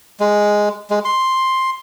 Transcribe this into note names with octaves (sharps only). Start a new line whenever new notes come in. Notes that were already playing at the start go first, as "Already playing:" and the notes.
G#3
G#3
C6